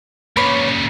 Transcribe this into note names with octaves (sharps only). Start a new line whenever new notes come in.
A#2 C#3 B4 C#5 D6